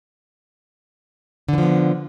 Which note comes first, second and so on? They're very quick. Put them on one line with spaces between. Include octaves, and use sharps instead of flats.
D3 E3 F3 B3